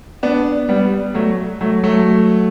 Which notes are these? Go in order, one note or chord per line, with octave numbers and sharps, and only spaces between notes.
B3 D4
G3 B3
F#3 A3
F#3 A3
F#3 A3